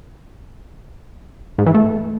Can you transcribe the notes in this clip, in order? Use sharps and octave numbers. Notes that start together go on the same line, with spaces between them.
G#2
E3
A3